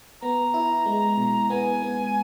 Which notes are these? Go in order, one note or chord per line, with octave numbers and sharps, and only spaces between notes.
B3 A#5
E4
G#3
B2
B3 G#5
B3